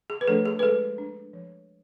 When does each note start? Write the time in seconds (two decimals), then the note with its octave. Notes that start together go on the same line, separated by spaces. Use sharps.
0.10 G#4
0.21 B4
0.28 F3 A3 D4 A4
0.46 G#4
0.59 B4
0.63 G#3 A4
0.98 D4
1.33 F3